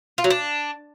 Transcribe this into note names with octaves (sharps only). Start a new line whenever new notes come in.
F4
F#3
D4